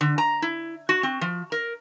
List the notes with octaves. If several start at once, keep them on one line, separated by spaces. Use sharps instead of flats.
D3
A#5
E4
F#4
C4
F3
A#4